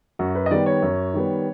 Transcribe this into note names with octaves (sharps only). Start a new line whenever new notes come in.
F#2 F#4
B4
D#5
D#3 G3 B3 D5
C#5
F#2
D#3 G3 B3